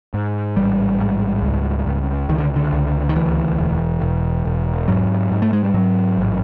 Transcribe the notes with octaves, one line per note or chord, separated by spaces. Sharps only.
G#2
A1 G3
G#2
C#2
C#2
C#2 D#3
D3
D3
C#2
D#3
D2 E3
E1
E1
E1
G#2 F#3
G#2
A3
G#3
G3
G#2 F#3
A1